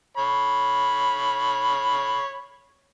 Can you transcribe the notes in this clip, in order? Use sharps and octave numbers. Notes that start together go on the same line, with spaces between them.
C#5 B5